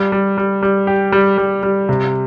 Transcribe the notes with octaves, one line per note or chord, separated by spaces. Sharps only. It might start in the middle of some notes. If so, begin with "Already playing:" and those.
Already playing: G3
G3
G3
G3
G4
G3
G3
G3
C3